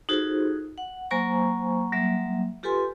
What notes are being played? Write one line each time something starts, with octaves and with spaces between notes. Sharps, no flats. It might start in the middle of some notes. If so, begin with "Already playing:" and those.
D#4 F4 F#4 G#4 A4 C5
F#5
F#3 A#3 C5 G#5 A#5 C#6
F#3 G3 A#3 E5
F4 G4 A4 B4 G#5 C6